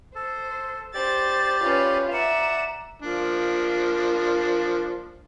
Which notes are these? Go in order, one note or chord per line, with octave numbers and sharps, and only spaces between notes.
A4 C5
G4 C5 D5 A6
C#4 F4 B4
D5 E5 F#5 A#5 E7
F3 A#3 D4